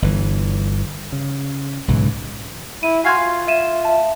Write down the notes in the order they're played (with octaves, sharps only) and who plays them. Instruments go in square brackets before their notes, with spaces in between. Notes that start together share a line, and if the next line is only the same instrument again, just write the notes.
[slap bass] G1 E3
C#3
B1 G#2 C#3 E3
[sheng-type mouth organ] E4 [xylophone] D#7
[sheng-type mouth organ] F#4 F5 G#5 [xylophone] C6 G#6 C7
[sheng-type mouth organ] F4
[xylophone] E5 D#7 E7
E5 A5